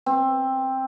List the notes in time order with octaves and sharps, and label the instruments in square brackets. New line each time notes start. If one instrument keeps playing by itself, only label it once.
[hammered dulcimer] C4